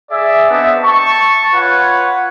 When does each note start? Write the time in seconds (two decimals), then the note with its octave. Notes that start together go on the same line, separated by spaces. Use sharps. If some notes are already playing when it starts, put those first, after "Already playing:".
0.11 G#4 D5 E5
0.50 B3 C4 D4 D#5 E5
0.83 A5 C#6
1.53 F4 B4 C#5 F#5